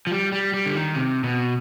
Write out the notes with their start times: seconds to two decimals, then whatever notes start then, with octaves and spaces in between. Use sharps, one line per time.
0.07 F3
0.11 G3
0.32 G3
0.53 G3
0.66 D3
0.75 D#3
0.95 C3
1.24 B2